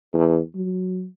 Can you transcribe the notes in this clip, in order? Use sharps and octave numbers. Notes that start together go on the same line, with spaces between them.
E2
F#3